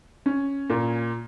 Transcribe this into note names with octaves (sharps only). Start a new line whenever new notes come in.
C#4
A#2